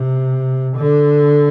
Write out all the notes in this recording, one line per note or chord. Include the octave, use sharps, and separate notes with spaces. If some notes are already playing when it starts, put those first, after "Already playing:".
Already playing: C3
D3